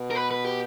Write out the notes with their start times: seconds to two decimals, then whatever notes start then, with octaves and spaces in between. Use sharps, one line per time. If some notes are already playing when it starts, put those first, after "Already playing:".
Already playing: B2
0.11 A#4
0.15 B4
0.31 B4
0.45 G4